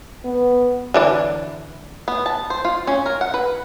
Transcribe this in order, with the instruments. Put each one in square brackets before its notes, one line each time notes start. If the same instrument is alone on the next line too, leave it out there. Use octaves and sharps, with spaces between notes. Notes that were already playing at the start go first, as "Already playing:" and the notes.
[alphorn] B3
[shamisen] D3 E3 D4
[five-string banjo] B3
A5
C5
F4
C#4
A#4
F#5
B4